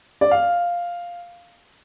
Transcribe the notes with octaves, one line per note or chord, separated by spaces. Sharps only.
D5
F5